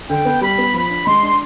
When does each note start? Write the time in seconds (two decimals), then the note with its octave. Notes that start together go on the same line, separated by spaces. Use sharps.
0.09 D3 G5
0.25 B3
0.41 G3 B5
0.58 B3
0.74 F3 B5
0.90 D4
1.06 G#3 C6
1.23 D4